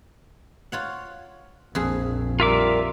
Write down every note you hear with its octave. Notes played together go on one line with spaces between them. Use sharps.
F4 C#5 F#5
A#1 F2 G#4
G3 F4 A#4 E5 D6